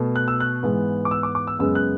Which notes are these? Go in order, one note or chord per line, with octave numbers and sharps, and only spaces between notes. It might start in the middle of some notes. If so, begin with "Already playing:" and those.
Already playing: B2 A3
F#6
E6
F#6
G#2 E3 G#3 B3
D6
E6
D6
D6
E6
F#2 C#3 G#3 B3 E6
F#6